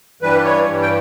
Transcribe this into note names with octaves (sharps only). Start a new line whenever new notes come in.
G2 E3 G3 B4
C#5
G2 E3 G3
G5